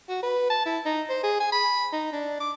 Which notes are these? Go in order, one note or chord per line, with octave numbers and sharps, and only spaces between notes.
F#4
B4
A5
E4
D#4
C5
G#4
G#5
B5
D#4
D4
D6